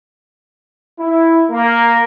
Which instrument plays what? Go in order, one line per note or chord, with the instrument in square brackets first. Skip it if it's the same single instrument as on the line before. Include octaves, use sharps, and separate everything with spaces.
[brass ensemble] E4
A#3